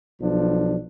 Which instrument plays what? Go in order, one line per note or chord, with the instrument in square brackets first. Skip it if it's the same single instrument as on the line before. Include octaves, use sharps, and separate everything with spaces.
[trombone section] B1 F3 D4